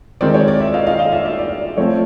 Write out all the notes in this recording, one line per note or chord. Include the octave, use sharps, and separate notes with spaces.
D#3 G#3 C4 D5
C#5
D5
D5 E5
D#5 F5
D#5 F5
D#5 F5
D5 E5
D5 E5
D5
F3 A3 C4 C#5